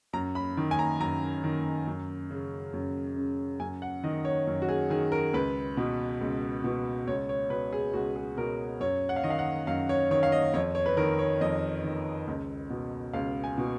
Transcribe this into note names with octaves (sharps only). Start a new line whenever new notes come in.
F#2 A#5
B5
D#3
G#5
A#5
F#2 A#5
D#3
F#2
C#3
F#2
C#3
F#2 G#5
F#5
D#3 D#5
C#5
F#2
F#4
G#4
D#3 G#4
A#4
C#2 B4
B2
C#2
B2
C#2 C#5
C#5
B2 B4
G#4
C#2 F#4
G#4
B2 A#4
F#2 C#5
F#5
F5
D#3 D#5
F5
F#5
F#2 F5
C#5
D#3 C#5
F5
D#5
F2 C#5
C#5
B4
D#3 A#4
C#5
F2 D#5
D#3
C#2
B2
C#2 F5
G#5
B2